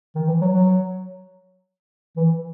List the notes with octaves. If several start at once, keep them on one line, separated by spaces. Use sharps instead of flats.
D#3
E3
F#3
F#3
E3